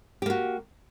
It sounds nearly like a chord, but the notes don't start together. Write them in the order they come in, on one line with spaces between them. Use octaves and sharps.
G4 A#3 F#4